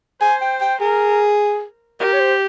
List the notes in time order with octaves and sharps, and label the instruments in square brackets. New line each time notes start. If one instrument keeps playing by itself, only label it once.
[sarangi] C5 [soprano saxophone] G#5
[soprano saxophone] G5
G5
[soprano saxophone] G#4 [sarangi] A#4
[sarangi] G4 [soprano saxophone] A#4
[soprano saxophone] C#5
C5